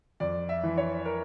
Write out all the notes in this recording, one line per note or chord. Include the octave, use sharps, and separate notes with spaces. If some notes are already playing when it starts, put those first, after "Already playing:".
F2 D5
E5
E3
C#5
A#4